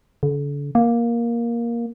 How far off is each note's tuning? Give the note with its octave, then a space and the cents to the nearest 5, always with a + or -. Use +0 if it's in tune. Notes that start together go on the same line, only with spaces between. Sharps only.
D3 -40
A#3 +10